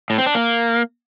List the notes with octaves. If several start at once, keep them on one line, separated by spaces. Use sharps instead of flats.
A2
C4
D4
A#3